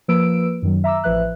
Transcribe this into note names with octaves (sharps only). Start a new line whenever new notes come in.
F3 A#3 B4 E6 D7
F#2 D#3 F#3
E5 A#5 D6 E6
A1 F3 B4 E5 F#6